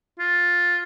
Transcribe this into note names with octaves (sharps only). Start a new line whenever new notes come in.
F4